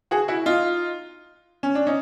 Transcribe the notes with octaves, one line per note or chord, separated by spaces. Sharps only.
F#4 G#4
E4 F#4
D#4 F4
C#4
D4
C#4 D#4